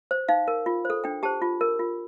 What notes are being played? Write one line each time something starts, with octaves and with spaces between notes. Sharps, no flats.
C5
D#4 F5
A#4
F4
C5
A4
D4 G5
G4 C5 A5
F4
A#4
F4